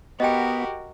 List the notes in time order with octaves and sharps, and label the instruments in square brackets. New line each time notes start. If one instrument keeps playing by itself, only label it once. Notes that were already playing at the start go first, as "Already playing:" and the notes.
[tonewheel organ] B3 [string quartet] F#4 A#4 [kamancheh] G4 [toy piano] D#5 G5